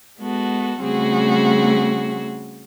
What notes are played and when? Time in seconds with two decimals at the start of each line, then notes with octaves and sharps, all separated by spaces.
0.20 G#3 B3 F#4 A4
0.82 C#3 G3 A3 C4 F#4 G#4